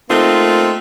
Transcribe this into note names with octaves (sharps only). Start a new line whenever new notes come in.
A3 A#3 C4 D#4 F4